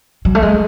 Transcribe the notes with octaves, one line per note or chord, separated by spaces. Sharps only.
F#3
A3
G#3